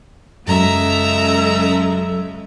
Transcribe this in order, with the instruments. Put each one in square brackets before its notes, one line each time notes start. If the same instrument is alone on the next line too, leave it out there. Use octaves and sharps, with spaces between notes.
[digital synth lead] F#2 [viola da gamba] C#3 G#3 [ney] A4 [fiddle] E5 A#5